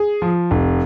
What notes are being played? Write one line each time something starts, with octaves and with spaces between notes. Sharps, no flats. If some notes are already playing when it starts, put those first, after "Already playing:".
Already playing: G#4
F3
F1